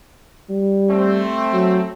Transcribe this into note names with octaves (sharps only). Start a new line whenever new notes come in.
G3
A3 C4
F#3